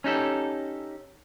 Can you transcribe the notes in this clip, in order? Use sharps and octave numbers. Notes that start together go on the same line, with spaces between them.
C#4 D#4 G4 A4